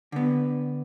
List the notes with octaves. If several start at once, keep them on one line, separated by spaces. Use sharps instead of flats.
D3 B3